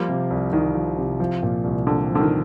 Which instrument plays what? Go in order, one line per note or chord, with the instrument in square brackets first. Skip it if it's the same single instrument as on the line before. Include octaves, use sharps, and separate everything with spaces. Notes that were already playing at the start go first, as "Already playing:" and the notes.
Already playing: [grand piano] F3 [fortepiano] G3 A#3
[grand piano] C3
C2
[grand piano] C2 [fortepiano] D#3
[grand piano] F3
C3
F3
A#2
C2
[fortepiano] D3 [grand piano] C4
[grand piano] F3
[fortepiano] D3
D#3